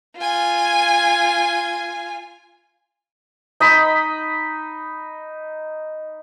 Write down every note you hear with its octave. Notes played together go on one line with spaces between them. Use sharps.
F4 G#5
D#4 D#5 B5